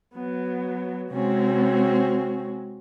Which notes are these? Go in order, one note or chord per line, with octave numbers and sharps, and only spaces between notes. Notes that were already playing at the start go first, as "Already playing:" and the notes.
F#3 B3
C3 G#3 C4 C#4 F#4